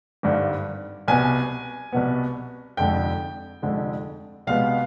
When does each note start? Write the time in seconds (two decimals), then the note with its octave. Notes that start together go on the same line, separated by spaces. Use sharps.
0.23 G#1 G2 D3 G3
1.08 C2 B2 B3 G#5
1.92 C2 B2 B3
2.77 F1 F2 D3 G#3 G5
3.62 F1 F2 D3 G#3
4.47 C2 B2 G#3 B3 F5